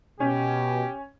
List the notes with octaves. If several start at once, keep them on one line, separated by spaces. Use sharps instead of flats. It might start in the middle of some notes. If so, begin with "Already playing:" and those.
B2 C#4 G4